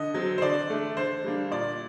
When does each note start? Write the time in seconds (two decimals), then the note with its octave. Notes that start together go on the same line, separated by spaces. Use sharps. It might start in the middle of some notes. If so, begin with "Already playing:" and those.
Already playing: D3 D#5
0.14 F#3 C4
0.38 C5
0.42 D3 D5
0.70 A3 D4
0.97 D3 C5
1.24 G3 A#3 D4
1.52 A#2 D5